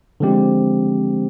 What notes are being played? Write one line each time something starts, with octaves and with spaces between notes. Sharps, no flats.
D3 F3 G#3 C4 G4